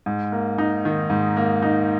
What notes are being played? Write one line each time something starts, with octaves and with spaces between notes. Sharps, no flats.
G#2
A#3
D#4
D#3
G#2
A#3
D#4